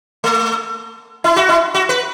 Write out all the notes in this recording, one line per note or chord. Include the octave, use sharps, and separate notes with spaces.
A3
E4
F#4
E4
F#4
B4